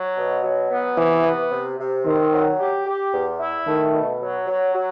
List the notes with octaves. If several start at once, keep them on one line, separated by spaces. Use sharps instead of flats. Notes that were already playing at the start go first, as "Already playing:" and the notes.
Already playing: F#3
B2
F#3
B3
C3 E3
B3
C3
C3
D#3 C4
F#3
G4
G4
E2
E4
D#3 A3
B2
F#3
F#3
F#3